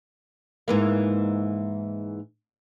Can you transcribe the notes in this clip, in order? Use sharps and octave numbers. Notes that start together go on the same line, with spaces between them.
G#2 E3 A#3